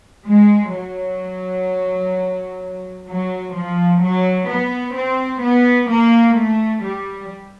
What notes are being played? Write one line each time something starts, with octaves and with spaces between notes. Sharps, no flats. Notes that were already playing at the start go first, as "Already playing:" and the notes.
G#3
F#3
F#3
F3
F#3
B3
C4
B3
A#3
A3
G3